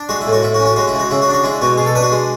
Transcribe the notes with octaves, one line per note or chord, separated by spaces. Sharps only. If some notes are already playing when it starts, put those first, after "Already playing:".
Already playing: D4
G#3 F#4
E4
A2
F#4
A2 E4
F#4
C#4
F#4
G#3 F#4
E4
C#3
F#4
C#3 E4
F#4
D4
F#4
G#3 E4
B2 F#4
B2 G#4
A4
D4 B4
F#4
G#3